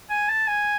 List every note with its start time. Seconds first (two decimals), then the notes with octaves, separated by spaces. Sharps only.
0.09 G#5
0.29 A5
0.47 G#5